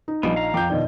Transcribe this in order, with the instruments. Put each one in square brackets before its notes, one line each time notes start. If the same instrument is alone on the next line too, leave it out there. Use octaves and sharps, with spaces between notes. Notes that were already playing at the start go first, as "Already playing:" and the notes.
[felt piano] D#4
[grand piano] A#1 [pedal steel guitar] F3 G3 B3 [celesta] D#5
[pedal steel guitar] F5 A#5
[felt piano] F2 [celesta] G5 [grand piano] D6 G6
[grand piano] G1 B2 D#3 [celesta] D5 D#5